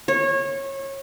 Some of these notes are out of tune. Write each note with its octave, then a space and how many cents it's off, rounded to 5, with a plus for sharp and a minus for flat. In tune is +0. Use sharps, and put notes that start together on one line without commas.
C#5 -25